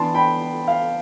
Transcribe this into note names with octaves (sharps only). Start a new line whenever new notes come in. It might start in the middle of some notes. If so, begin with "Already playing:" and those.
Already playing: E3 B3 D4 A5 C6
G5 B5
F5